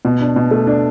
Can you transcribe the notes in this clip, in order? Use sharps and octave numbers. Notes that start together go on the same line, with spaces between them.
B2
D4
B2
A3
D4